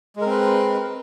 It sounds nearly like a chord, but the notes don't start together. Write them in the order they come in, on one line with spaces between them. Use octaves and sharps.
G#3 A#4 C4 B4